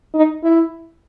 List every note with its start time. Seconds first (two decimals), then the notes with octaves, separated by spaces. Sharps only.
0.14 D#4
0.43 E4